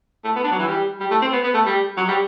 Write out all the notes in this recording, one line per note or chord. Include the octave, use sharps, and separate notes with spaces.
A3
B3
D4
F#3
E3
G3
G3
A3
C4
B3
B3
A3
G3
F#3
G3